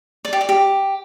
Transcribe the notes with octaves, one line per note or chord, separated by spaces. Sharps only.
D5
G4
D5
G4